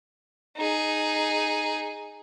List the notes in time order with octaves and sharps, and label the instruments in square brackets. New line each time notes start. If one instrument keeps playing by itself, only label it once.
[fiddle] D#4 G#4